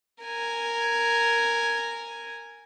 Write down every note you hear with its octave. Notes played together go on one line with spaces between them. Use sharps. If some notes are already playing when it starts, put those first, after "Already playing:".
A#4 G#5